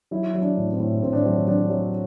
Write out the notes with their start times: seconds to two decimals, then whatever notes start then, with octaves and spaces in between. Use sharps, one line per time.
0.11 F#3 E4
0.34 F#3
0.42 D4
0.57 A2
0.72 C4
0.80 A2
1.02 A2 C4
1.13 D4
1.24 F#3 C4
1.47 F#3 D4
1.70 F#3